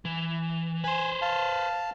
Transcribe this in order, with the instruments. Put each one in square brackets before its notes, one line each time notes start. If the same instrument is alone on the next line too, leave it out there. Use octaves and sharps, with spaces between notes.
[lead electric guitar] E3
[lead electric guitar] B4 C5 [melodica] G#5
[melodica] F5 A5